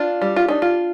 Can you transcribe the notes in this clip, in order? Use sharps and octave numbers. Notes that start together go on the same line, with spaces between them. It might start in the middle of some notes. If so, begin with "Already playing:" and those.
Already playing: D4 F4
G3
F4
D4 D#4
F4